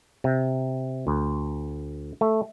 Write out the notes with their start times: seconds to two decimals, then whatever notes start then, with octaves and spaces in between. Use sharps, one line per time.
0.24 C3
1.07 D2
2.21 A3